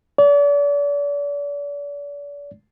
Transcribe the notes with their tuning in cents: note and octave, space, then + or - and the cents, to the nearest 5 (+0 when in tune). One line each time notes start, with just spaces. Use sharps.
D5 -40